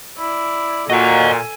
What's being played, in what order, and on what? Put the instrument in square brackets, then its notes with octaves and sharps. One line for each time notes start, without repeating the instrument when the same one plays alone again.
[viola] E4 D5
[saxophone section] A#2 [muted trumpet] F#4 [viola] A4 G#5 [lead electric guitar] D#5 F5